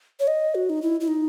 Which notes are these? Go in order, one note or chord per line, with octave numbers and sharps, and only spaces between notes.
C#5
D#5
F#4
D#4
E4
E4
D#4